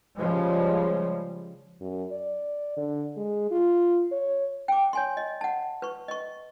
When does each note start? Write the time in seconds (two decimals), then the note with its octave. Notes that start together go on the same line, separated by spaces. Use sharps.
0.16 C#3 F3 G3 G#3
1.81 F#2
2.11 D5
2.77 D3
3.17 G#3
3.51 F4
4.12 C#5
4.68 G5 D6
4.93 C#5 G#5 C6
5.17 D#5
5.41 F#5 A5
5.82 B4 C#6
6.08 D#5 C#6